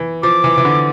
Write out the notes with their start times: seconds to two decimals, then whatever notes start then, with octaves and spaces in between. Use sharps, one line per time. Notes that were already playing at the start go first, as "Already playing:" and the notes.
Already playing: E3
0.23 F3 D6
0.44 E3
0.58 E3
0.65 D3